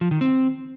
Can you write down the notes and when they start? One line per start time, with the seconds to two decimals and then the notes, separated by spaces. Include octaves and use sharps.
0.01 F3
0.11 D#3
0.21 C4